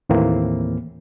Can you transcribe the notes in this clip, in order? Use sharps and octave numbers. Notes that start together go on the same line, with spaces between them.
D#2 A2 E3 A#3 C4